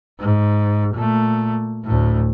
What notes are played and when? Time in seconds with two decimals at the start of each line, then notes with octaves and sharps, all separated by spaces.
0.20 G#2
0.94 A#2 A3
1.85 D2 A2